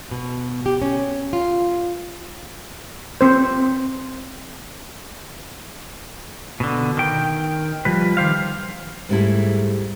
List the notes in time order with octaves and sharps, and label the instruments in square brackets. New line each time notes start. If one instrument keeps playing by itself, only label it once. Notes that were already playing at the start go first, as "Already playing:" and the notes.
[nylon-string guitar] B2
G4
C#4
F4
[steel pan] C4 C5
[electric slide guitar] B2 D3
D#3 G5
F3 G3 B4
D#3 G4 C5 F5
[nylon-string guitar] G#2 G3 A3 D4 E4 G#4